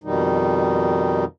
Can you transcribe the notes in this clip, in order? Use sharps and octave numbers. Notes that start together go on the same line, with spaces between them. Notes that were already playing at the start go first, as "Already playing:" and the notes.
F2 B2 D#3 G3 D#4